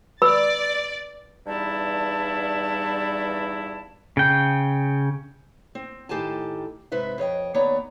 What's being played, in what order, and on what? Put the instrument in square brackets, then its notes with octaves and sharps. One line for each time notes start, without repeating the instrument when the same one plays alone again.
[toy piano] B4 B5 E6 [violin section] D5 A6
[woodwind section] E2 G2 G3 D#4 E4 A5
[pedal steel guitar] C#3 G5
[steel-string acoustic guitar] C4
A2 D#3 G4 A4 G#5 A5
G#2 C3 B4 E5
F2 C#5 D#5 G5
D#2 B3 C#5 D5 A#5